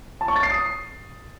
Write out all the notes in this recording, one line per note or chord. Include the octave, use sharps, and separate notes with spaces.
A5
C#6
A6
C7
D#6